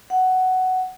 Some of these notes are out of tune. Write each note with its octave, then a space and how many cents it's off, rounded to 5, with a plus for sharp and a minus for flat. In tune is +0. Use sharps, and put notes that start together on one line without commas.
F#5 +10